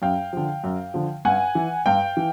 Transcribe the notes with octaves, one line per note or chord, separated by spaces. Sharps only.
F#2 F5 G5
D3 F3
F#2
D3 F3
G2 F#5 G#5
E3
G2 F5 G5
E3